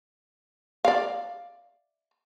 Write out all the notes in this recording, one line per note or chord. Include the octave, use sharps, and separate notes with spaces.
D5 F5